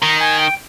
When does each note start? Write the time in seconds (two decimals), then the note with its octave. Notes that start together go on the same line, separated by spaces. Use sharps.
0.02 D#3 A#5
0.20 G#5
0.38 G5